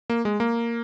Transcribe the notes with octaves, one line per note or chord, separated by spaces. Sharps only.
A#3
G#3
A#3